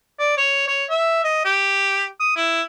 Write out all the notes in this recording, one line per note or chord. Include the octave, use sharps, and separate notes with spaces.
D5
C#5
C#5
E5
D#5
G4
D#6
E4